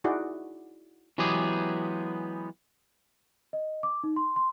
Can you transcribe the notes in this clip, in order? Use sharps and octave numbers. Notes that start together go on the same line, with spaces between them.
D#4 E4 F#4 G#4 D5
E3 F#3 G#3 B3 G4 G#4
D#5
D6
D#4
C6
C6